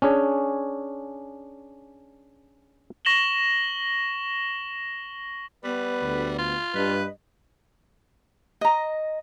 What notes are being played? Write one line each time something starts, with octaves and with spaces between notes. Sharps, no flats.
C#4 D4 G#4 C#5
C#6 A#6 E7 F#7 G7
G3 B3 B4
D2
F4
G2 B4 D#5
D#5 A#5